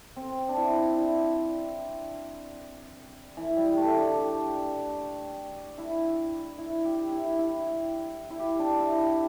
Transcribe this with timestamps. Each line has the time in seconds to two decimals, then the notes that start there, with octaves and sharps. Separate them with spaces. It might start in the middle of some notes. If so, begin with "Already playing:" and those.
0.16 C4
0.49 D4
0.57 E4
0.97 E4
3.37 E3
3.57 G3
3.77 A3
3.98 D4
4.18 G4
5.78 E4
6.58 E4
6.85 G4
7.12 E4
7.39 E4
8.30 E4
8.39 G4
8.59 D4
8.80 E4
8.99 G4